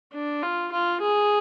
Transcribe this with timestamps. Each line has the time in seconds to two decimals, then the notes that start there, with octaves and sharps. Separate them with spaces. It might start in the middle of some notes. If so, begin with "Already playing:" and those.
0.13 D4
0.43 F4
0.72 F4
1.02 G#4